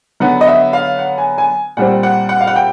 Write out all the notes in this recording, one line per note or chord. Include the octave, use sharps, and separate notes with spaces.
D3 F#3 B3 F#5
D#5
E5
F5
F#5
G#5
G#5
A#2 G3 C4 F#5
F#5
F#5
F5
F#5
G5